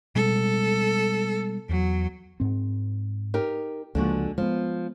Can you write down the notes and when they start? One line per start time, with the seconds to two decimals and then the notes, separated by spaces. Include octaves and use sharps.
0.16 B2 G3 G#3 A4
1.69 E2 F#3
2.40 G#2 C4
3.34 D#4 G4 A#4
3.95 C#2 D3 F3 G#3 A#3 F#4
4.38 F3 G#3 B3